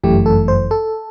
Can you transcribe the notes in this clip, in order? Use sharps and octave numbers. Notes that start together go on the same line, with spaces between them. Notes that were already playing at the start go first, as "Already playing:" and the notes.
G1 F#2 E3 A3 G4
A4
C5
A4